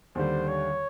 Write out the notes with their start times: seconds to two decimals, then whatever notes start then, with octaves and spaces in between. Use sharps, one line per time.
0.15 D#2 D3 G3 C5
0.48 C#5